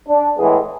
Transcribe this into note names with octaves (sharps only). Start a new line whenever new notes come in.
D4
A2 E3 G#3 B3 G#4